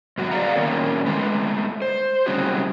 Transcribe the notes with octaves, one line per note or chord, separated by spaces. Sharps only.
G2 F#3 F#4
G#4 D5 F5 F#5 A#5
D#3 F#3 A#3 C#4 A#4 C#5
G#3 A3 B4
C5
C3 F#3 G3 C#4 F#4 G#4